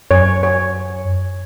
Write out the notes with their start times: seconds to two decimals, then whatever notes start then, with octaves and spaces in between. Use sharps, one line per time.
0.11 F#2 C#5
0.43 C#5